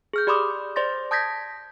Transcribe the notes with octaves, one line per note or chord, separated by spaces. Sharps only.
G#4 F6 G6
G4 D5 B5 C6 D6 D#6
C5 D5 C6 A6 A#6
A5 D#6 G6 G#6 A#6 B6